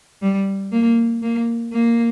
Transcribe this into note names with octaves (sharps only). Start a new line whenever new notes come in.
G3
A#3
A#3
A#3